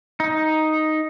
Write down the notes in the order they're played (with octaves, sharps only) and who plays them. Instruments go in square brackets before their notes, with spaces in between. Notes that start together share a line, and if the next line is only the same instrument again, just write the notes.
[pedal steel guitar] D#4